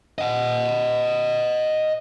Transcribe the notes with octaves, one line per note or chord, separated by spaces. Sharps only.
D#5 F#5